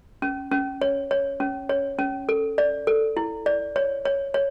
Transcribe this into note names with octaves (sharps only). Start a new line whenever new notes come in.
C#4
C#4
C#5
C#5
C#4
C#5
C#4
A4
D5
A4
E4
D5
C#5
C#5
C#5